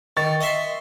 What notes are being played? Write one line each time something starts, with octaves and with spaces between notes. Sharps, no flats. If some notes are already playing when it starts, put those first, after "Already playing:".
D#3 C#6 A6
D#5 E5 C6